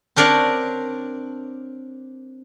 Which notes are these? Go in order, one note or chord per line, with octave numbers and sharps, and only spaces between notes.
C4 D4 A#4 C#5 D5 F#5